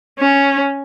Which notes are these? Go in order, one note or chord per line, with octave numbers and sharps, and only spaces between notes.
C#4